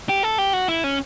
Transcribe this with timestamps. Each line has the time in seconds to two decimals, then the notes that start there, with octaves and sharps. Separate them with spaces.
0.09 G4
0.23 A4
0.38 G4
0.53 F#4
0.68 E4
0.84 C#4